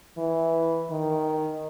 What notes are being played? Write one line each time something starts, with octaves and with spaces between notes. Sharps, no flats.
E3
D#3